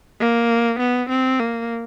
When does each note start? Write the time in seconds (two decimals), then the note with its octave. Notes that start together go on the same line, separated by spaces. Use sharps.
0.20 A#3
0.79 B3
1.10 C4
1.40 A#3